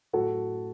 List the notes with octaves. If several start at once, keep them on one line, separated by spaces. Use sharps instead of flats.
A2 F#3 F#4 A4